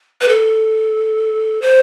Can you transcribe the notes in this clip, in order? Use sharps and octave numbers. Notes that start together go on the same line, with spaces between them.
B4
A4
C5